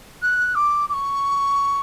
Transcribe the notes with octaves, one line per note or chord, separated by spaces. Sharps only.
F#6
D6
D6
C#6